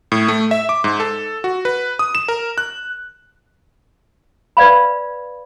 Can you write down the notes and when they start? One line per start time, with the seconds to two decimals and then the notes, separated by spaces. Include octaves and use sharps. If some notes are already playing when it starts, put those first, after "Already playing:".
0.12 A2
0.28 A3
0.51 E5
0.69 D6
0.84 G#2
1.00 A4
1.44 F#4
1.65 B4
1.99 D#6
2.15 E7
2.28 A#4
2.58 F#6
4.57 B4 D5 F5 B5